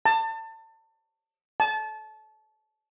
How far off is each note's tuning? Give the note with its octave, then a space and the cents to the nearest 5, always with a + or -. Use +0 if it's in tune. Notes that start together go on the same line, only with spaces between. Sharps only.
A5 +30
A5 -25